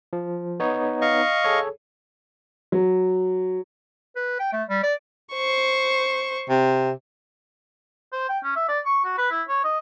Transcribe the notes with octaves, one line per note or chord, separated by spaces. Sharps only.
F3
B3 D#4 C#5
D#5 F5 C#6
G#4 A4 C#5
F#3
B4
G5
A3
G3
D5
C5 C#6
C3
C5
G5
C#4
E5
D5
C#6
F#4
B4
E4
C#5
D#5